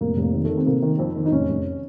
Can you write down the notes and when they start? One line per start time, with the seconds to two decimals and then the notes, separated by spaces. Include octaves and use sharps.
0.01 F1 A#3
0.17 F1
0.23 A#3
0.33 D#3
0.44 D#3 A3
0.58 C4
0.66 C3 A#3
0.82 D#3
0.99 F2 C4
1.16 D#3
1.26 D#4
1.32 F1 C#4
1.48 F1